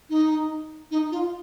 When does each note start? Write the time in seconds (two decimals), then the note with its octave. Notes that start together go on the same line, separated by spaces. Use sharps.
0.10 D#4
0.91 D#4
1.12 F4